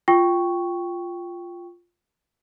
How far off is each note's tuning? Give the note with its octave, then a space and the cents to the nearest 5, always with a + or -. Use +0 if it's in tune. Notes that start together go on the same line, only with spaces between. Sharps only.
F4 +0 G5 +0 C#6 +0